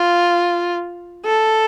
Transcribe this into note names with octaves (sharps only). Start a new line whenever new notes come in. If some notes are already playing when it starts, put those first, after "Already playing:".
Already playing: F4
A4